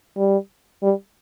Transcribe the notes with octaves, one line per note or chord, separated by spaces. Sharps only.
G3
G3